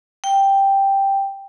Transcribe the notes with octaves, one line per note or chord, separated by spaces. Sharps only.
G5